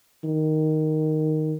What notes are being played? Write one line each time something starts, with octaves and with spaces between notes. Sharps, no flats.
D#3